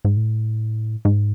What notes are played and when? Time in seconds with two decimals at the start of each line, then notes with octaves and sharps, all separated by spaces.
0.05 G#2
0.17 A2
1.05 G#2